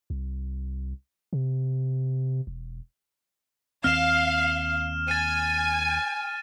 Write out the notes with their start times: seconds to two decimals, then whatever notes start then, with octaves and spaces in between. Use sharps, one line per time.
0.10 C2
1.33 C3
2.47 E1
3.84 D#2 C4 F5 F6 E7
5.08 G#5 A6 D#7